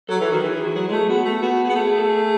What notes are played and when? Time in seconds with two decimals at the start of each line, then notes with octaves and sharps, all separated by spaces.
0.09 F#3 A4
0.21 E3
0.31 D#3 F#4
0.43 E3 G#4
0.65 F#4
0.75 F#3 G#4
0.88 G#3
0.92 A3
1.09 B3 F#4
1.25 A3
1.42 B3 F#4
1.65 B3 G#4
1.76 A3
1.87 G#4
1.98 A4
2.09 G#4